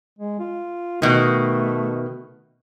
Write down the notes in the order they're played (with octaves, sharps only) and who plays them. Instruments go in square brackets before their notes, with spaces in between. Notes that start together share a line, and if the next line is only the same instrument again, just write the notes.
[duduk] G#3
F4
[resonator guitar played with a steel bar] B2 D#3 [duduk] A3